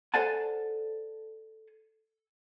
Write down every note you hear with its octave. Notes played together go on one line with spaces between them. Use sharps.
A4 C5 D5 F#5 G#5 A5